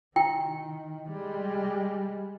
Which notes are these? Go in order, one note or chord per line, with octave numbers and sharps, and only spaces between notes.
D#3 E4 G5
G3 G#3